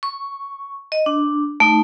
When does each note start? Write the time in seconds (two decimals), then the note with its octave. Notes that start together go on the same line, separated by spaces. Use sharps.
0.03 C#6
0.92 D#5
1.06 D4
1.60 A3 D#4